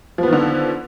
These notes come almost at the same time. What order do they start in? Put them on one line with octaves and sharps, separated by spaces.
F3 B3 D#3 D3